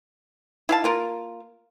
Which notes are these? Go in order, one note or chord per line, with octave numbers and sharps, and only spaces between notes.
E4 F5 A5
A#3 F4 A#4